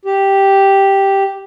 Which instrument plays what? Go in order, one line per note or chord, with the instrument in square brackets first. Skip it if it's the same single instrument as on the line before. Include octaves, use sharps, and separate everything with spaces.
[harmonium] G4